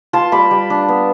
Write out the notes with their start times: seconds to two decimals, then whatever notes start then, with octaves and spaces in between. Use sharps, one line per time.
0.13 F4 A5 C6
0.32 G3 B5 D6
0.51 G3
0.70 D4
0.89 B3